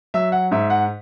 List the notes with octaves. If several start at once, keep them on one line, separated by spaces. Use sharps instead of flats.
F#3 E5
F#5
G#2 E5
F#5